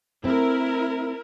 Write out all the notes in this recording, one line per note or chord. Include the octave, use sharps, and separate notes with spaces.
A3 C4 E4 A#4